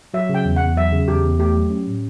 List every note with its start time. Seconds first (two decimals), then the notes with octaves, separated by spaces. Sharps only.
0.14 F#3 E5
0.29 C#3
0.34 G5
0.45 E2
0.56 F#5
0.61 E2
0.77 F#3 E5
0.92 C#3
1.08 E2 G4
1.23 E2
1.39 A3 G4
1.56 F#3
1.70 C#4
1.87 A2